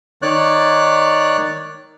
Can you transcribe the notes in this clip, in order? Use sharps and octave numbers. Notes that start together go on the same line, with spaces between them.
D#3 C#5 D5 F#6